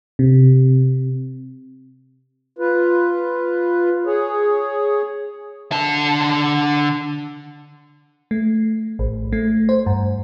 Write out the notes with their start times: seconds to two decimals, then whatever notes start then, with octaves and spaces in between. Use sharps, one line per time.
0.19 C3
2.59 F4 B4
4.06 G#4 C#5
5.72 D3 A5
8.31 A3
8.99 A1
9.33 A3
9.69 C5
9.86 G2